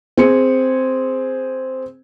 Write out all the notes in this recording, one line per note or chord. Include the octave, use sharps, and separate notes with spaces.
C4 G#4 C#7